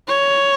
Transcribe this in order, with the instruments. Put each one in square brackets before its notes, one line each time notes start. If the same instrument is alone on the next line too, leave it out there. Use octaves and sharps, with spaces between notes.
[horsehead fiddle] C#5